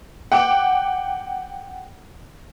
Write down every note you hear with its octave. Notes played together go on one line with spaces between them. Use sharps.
F#5 G5 D6